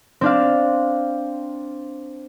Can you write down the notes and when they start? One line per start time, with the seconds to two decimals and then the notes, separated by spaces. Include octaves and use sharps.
0.21 C4 D4 F5